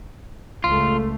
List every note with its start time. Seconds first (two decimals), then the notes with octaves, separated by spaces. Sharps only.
0.64 C#2 A3 F4